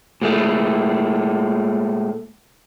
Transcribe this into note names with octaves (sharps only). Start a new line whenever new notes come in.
A#2 G#3 A3